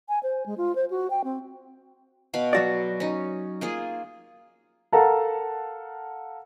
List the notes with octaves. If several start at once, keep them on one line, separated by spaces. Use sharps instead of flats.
G#5
C5
G#3
F4
C5
F#4
G5
C4
B2 F5 B5
F#3 F#4 D5
C#4 D#4
A#3 F4 G#4
A4 A#4 F5 F#5 A5 A#5